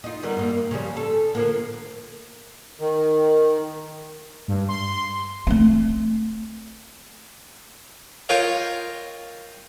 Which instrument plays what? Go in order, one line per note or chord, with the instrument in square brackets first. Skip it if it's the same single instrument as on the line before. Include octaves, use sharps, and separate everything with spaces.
[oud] D#4 F4
D#3 G3 B3
G2 A#3
C#3 F3 G3
A4
D3 F3 A#3
[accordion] D#3
[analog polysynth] G2
C6
[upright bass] A3 C4
[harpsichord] F4 A#4 C#5 D#5 F5 G5